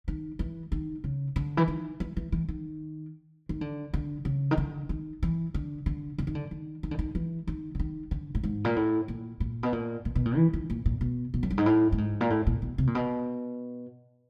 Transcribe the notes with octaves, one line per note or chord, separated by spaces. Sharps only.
D#3
E3
D#3
C#3
D3
E3
D#3
E3
E3
E3
D#3
D#3
D3
D3
C#3
D#3
D3
D#3
E3
D3
D3
D3
D#3
D3
D#3
D#3
D3
D#3
E3
D#3
D3
D#3
D3
A2
G#2
A#2
A2
A#2
A#2
B2
A#2
A#2
B2
A#2
E3
D#3
A#2
A#2
B2
B2
F#2
G2
G#2
A2
A2
G#2
A#2
A2
A#2
B2
C3
A#2
B2